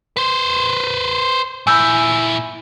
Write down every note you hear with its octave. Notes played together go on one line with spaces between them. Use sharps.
B4 C5
A#2 E4 G#5 E6 G6